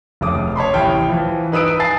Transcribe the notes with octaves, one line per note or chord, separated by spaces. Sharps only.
F1 F2 C#3 D6 D#6
C#5 A5 B5 C6
A1 C3 E4 G5 F6
E3 F3
D#4 B4 D#6 E6 D7
G#5 A5 A6 C7